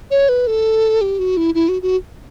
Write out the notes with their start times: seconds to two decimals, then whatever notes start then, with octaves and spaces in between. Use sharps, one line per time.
0.11 C#5
0.29 B4
0.47 A4
1.01 G4
1.19 F#4
1.37 E4
1.55 E4
1.69 F#4
1.82 F#4